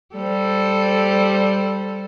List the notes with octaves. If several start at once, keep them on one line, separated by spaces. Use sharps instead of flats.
G3 A4 C5